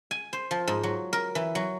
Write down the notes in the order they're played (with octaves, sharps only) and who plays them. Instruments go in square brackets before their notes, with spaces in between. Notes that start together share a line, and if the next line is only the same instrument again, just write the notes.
[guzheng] G#5
C5
F3
G#2
F#3
A#4
E3
F#3